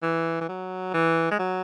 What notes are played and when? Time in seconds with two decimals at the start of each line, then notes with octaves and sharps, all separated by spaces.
0.03 E3
0.41 E3
0.49 F#3
0.94 E3
1.31 G#3
1.39 F#3